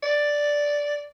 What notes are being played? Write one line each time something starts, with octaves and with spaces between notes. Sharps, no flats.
D5